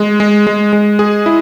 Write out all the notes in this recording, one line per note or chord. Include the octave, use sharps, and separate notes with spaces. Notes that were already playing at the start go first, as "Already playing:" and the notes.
Already playing: G#3
G#3
G#3
G#3
G#4
E4